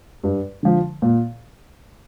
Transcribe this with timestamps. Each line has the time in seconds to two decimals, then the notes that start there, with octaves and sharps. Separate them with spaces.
0.24 G2
0.63 D3 F3
1.02 A#2